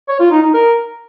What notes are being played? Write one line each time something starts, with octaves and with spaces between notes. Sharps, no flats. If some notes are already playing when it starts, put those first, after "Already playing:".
C#5
F4
D#4
D#4
A#4